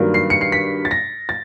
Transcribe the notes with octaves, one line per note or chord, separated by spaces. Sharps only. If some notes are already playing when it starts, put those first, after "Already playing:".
Already playing: G2 D#3 F#3 A#3 D4
C7
C#7
C7
B6
A6
A#6
A6